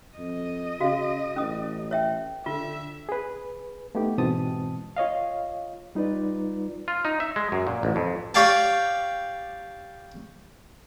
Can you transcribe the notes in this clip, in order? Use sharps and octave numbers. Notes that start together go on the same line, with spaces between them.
F2 D#5
C#3 F#4 F5
A1 C#4 D#6
C#5 E5 G5
D3 F4 E5
G#4 B4
A3 B3 D#4 G4
G#2 B2 E3 C4 A5 D#6
F4 C#5 D#5 F5
G3 D#4 F4 B4 D5
F4
D#4
E5
G#3
F#2
A#2
A1
F2
G4 C#5 D5 F5 G5 A5